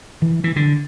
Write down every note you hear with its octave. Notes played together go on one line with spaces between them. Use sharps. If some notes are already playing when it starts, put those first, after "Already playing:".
E3
E3
D3